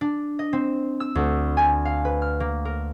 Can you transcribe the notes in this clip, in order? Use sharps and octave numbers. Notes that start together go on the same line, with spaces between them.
D4
D#5
C4
E6
D2
G#5
F5
B4
F6
A#3
A#4